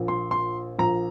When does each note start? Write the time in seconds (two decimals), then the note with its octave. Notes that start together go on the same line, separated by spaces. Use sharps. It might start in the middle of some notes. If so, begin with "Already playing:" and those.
Already playing: A#1 A#2
0.08 C6
0.31 C6
0.79 A#1 A#2 A#5